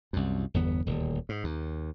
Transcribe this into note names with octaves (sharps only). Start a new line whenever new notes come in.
C2 F#2
G1 E2 B3
D#1 D2
G#2
D#2